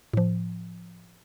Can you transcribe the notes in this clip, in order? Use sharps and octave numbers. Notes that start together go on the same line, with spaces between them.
A2 F3